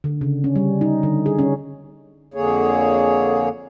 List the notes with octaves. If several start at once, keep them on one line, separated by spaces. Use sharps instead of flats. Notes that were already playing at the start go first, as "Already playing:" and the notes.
D3
C#3
C#4
G3
D#4
D3
G#4
C#4
F2 D3 A#3 G#4 C#5